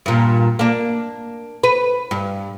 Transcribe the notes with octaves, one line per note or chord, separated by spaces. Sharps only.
G2 A#2
A#3 D4
B4
G2